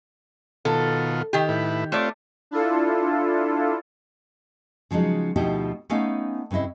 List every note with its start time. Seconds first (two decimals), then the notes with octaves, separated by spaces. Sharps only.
0.65 B2 D#3 F4 A4
1.33 D#3 G4
1.49 A2 E4 B4
1.92 A3 C4 F4 C#5 D5
2.51 D4 E4 F4 A4
4.91 C#3 F3 F#3 G#3 D#4
5.36 D2 B2 F3 D#4 E4 G4
5.90 A3 B3 C#4 D#4 F5 G#5
6.51 G2 C#3 C4 E4 D#5